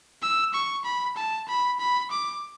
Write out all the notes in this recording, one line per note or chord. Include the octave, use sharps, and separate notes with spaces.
E6
C#6
B5
A5
B5
B5
D6